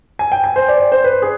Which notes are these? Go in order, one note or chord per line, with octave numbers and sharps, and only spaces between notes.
G#5
G5
G#5
C5
D5
D5
C5
B4
G#4